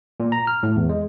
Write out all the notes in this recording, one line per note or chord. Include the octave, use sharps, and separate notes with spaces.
A#2
A#5
F6
A2
E2
G#3